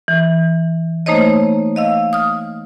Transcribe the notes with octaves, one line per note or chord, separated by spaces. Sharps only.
E3
A3 A#3 D#4 C5 C#5 D#5
D#5 F5 E6
D#6 F6